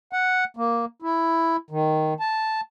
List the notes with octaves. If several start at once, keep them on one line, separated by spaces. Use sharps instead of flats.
F#5
A#3
E4
D#3
A5